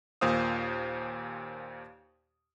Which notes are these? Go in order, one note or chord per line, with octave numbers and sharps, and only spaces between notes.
D#2 A#2 C5 F5 D#6